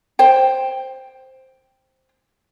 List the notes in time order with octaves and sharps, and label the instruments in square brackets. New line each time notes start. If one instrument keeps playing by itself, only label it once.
[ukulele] C5 G5